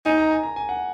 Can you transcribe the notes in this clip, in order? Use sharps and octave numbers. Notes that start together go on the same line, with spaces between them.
D#4 G#5
A#5
G#5
A#5
G#5
F#5